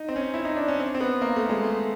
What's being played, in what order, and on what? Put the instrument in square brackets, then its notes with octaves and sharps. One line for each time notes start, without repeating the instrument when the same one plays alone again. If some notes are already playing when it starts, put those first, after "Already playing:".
Already playing: [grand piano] D#4
C4
C#4
E4
D#4
D4
C#4
C4
C4
B3
A#3
A3
G#3
A3